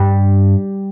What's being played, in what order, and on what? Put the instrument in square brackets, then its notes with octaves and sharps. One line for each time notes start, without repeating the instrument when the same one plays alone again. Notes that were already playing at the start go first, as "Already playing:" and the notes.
Already playing: [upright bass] G2 [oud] G3